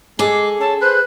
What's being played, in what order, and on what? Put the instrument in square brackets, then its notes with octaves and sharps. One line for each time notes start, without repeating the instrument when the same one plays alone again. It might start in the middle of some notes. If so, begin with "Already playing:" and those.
[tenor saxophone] G#3 [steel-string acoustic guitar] G#4 A4 [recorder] D6
[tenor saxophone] C#4 [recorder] A5
[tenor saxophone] B4 [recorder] C5 [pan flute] F#6